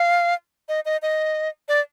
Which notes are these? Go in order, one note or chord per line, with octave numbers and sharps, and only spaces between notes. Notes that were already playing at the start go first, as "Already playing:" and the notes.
Already playing: F5
D#5
D#5
D#5
D5